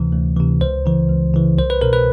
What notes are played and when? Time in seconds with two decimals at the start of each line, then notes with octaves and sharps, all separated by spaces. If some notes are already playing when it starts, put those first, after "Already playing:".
Already playing: D2 C3 E3
0.12 D2
0.37 C3 E3
0.61 C#2 C5
0.86 C#3 E3
1.09 C#2
1.34 C#3 E3
1.58 C2 C5
1.70 B4
1.81 B2 A#4
1.93 B4